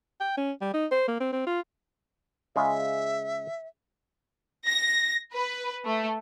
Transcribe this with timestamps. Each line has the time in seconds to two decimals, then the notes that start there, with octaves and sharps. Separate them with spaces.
0.20 G5
0.37 C#4
0.61 G3
0.74 D#4
0.92 C5
1.08 A#3
1.20 C4
1.33 C4
1.47 F4
2.56 C#3 G#3 F4 E5
4.67 A#6
5.34 B4
5.85 A3